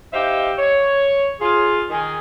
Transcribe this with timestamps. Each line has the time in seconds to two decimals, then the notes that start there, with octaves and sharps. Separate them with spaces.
0.13 D#4 G4 C5 E5 F5
0.58 C#5
1.40 F4 G#4
1.90 D#3 G#4